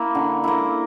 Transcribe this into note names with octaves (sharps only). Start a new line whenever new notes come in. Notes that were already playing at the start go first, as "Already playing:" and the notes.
Already playing: A#3 E4
D3
A#3 E4